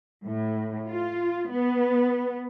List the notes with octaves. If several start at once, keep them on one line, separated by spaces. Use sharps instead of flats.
A2
F4
B3